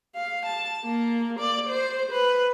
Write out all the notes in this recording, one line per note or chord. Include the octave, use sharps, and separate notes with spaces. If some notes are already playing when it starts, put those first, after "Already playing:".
F5
A5
A#3
D5
C5
B4